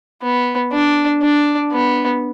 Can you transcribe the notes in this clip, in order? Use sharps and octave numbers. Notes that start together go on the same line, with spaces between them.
B3
D4
D4
B3